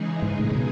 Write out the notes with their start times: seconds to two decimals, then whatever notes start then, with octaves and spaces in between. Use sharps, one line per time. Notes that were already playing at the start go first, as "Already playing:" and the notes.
Already playing: C#3 E3 G#3 D#4 G#4
0.22 G#2
0.39 A2
0.51 A2
0.56 B2